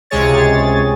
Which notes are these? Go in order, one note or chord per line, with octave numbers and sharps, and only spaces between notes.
C#2 C3 G#3 G#4 C#5 A6